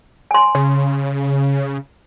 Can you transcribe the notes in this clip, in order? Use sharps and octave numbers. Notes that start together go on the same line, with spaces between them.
G#5 C6
C#3